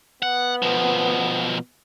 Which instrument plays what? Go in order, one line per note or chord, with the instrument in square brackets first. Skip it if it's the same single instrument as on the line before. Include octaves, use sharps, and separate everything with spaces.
[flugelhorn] B3 [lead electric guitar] F#5
[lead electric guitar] B2 F3